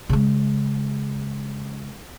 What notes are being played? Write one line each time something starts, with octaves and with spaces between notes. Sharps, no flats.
C#3 G#3